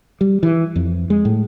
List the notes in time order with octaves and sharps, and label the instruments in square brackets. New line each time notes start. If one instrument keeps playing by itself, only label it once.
[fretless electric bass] G3
E3
F2
G#3
A2